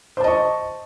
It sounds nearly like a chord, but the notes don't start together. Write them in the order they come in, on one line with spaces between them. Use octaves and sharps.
C5 A5 D#5 C#6